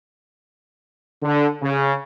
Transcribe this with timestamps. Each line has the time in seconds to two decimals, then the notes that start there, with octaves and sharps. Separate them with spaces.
1.22 D3
1.62 C#3